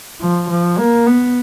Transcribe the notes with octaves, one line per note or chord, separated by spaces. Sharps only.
F3
F3
A#3
B3